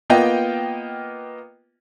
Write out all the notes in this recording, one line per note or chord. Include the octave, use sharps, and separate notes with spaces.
A#3 B3 F4 D#5 G5